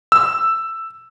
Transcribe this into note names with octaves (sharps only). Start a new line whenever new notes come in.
E6